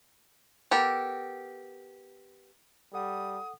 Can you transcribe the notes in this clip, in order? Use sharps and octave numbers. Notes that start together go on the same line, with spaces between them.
B3 G4 A4 A#4
G3 A4 F#5 D#6